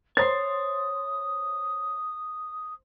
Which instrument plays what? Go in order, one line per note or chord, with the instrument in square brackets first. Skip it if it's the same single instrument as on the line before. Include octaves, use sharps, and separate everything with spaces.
[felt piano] C5 A6 [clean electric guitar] C#5 A#5 C6 [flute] D#6